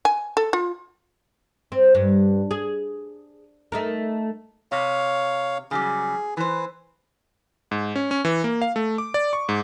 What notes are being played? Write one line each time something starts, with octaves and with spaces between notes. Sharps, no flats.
G#5
A4
F4
C4
G2
G#4
A3 D#4 A#4
C3 C#5 F5
C#3 F#3 G3 G#4
E3 B4 C5
G#2
C#4
C#4
E3
A#3
F5
A3
D6
D5
C#6
G#2